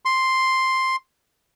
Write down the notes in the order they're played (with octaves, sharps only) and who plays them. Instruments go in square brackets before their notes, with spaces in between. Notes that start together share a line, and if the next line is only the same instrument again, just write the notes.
[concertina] C6